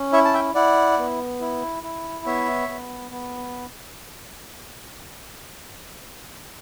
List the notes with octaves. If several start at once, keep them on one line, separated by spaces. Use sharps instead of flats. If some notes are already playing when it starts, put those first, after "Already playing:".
Already playing: C#4
E4 C#5 E5
A5
E5 G5
E4 D5 F#5
B3
E4
E4
B3 C#5 E5
B3
B3